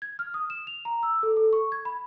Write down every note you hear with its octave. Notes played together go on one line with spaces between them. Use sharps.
G#6
F6
D#6
E7
F7
A#5
E6
A4
A4
C#6
G#6
B5